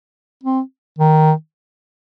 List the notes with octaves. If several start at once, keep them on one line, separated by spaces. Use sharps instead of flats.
C4
D#3